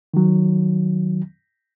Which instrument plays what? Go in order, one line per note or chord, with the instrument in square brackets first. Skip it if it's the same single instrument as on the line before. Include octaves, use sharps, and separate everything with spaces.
[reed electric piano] D#3 F#3